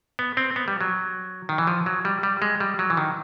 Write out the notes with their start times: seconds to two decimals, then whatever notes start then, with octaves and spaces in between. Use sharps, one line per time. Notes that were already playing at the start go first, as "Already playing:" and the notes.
0.19 B3
0.37 C4
0.56 B3
0.68 G3
0.81 F#3
1.49 D#3
1.58 E3
1.67 F3
1.86 F#3
2.05 G3
2.23 G3
2.42 G#3
2.60 G3
2.79 F#3
2.90 E3
2.97 D#3